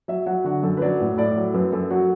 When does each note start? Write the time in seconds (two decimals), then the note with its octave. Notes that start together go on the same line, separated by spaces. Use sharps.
0.08 F#3 E5
0.26 F#3 F#5
0.44 D3 F#4
0.63 F#2 A4
0.77 B4
0.81 F#3 D5
1.00 A2
1.17 A2 D5
1.36 F#3
1.54 F#2 B4
1.72 F#2 A4
1.90 F#3 F#4